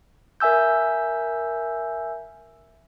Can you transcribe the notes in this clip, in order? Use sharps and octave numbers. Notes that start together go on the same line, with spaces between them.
A#4 E5 G#5 E6 G6